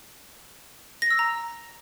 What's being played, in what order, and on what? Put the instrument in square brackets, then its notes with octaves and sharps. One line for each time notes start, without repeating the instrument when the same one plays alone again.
[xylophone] A#6
E6
A#5